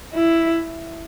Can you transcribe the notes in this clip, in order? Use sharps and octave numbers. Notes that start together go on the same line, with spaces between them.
E4